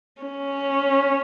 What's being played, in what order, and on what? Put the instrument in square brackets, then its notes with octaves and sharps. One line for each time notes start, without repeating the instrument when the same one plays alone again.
[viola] C#4